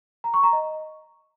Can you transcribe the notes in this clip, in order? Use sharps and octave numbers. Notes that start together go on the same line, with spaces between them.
A#5
C#6
A#5
D#5